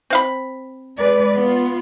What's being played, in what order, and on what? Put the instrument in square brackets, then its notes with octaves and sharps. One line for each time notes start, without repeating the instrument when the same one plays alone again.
[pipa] C4 F5 B5
[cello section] G#3 B4 D5
B3 F4